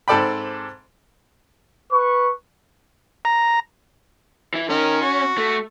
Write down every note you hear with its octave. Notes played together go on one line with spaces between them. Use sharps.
G#2 C4 A4 D5 G5 B5
B4 C#6
A#5
E3 E4
D#3 C#4 A#4
F#4
A3